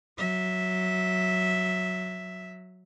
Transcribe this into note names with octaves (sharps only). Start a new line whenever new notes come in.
F#3 E5